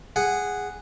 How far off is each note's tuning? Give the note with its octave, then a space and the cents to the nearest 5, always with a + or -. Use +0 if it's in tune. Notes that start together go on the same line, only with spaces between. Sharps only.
G#4 -10 F#5 +0